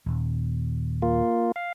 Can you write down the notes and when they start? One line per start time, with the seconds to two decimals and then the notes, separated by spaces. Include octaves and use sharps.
0.06 D#1
1.02 A#3 F4
1.56 F5